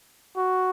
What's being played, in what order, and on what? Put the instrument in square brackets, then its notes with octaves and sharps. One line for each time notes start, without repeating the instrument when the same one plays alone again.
[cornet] F#4